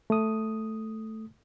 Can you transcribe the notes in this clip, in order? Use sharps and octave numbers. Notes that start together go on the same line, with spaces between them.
A3 D#6